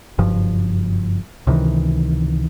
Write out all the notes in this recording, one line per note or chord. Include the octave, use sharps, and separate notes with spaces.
F#1 G2 F3
C#2 C3 D#3 E3